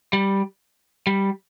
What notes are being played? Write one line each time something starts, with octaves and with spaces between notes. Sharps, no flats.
G3
G3